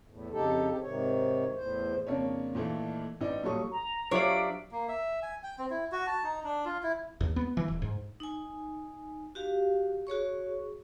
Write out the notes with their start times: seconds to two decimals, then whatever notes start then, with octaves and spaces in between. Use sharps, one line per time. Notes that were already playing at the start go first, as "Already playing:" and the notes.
0.08 E2 A2
0.32 F2 C#3 D#4 G4 A4
0.69 C4 G4
0.82 G#2 C3 D#3 C#5
1.55 E2 A2 C5
2.07 F2 C#3 A#3 D4 C#5
2.55 A#2 D#3 E3 A3
3.21 A1 D#4 D5
3.43 A#2 F#3 G3 A4 C#6 D#6
3.72 A#5
4.11 F#3 D4 F4 G4 C#5 E5 F5 D7
4.72 A#3
4.88 E5
5.23 G#5
5.43 G5
5.58 C4
5.70 E4
5.92 F#4
6.07 A5
6.24 D#4
6.44 D4
6.65 F4
6.83 E4
7.21 D#2
7.36 B3
7.57 E3
7.68 D1
7.82 G#2
8.20 D#4 G#5
9.35 F#4 G4 F5
10.07 F#4 G#4 C#5 C#6